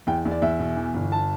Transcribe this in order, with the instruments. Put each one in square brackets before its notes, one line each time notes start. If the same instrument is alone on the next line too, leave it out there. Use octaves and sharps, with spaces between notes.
[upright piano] E2 G5
E2
D5
E2 E5
B2
E3
G1
A5